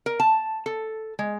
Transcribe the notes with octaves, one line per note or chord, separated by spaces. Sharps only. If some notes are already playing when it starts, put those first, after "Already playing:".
A#4
A5
A4
G#3